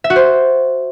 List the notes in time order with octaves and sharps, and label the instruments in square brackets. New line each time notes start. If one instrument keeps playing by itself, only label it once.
[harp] E5
F#4
C5